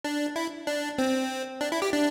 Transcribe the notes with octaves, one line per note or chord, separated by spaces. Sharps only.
D4
E4
D4
C4
D4
E4
G4
D4